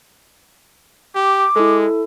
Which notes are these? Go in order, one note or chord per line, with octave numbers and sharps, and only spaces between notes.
G4 D6
G#3 E4 A4